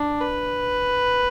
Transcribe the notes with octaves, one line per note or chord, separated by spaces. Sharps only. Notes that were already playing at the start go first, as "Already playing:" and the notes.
Already playing: D4
B4